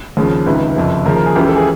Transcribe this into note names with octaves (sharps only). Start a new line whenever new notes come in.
D#2 C#3 F3
C#2 C3 D#3 B4
F#1 F2 C3
D#2 C#3 F3 A#4
A#4
G#4
C#2 C#3 E3 G4
A4
G#4